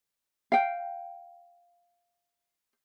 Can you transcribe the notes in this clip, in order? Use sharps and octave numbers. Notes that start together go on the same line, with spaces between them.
F5 G5